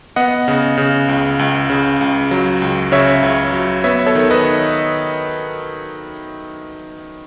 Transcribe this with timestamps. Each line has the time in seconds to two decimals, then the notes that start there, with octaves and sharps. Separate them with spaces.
0.16 B3 D#5 F#5
0.48 C#3
0.78 C#3
1.08 C#2
1.39 C#2
1.70 C#3
2.01 C#2
2.31 F#3
2.62 C#2
2.92 C#3 C#5 E5
3.23 C#2
3.53 F#3
3.84 B3 C#5 E5
4.06 A4 C#5
4.15 D#3
4.31 B4 D#5